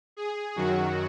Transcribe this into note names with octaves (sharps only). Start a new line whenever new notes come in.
G#4
F#2 D#3 F#3 F#4